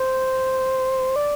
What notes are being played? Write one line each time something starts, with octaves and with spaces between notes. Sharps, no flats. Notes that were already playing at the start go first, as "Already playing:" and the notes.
Already playing: C5
D5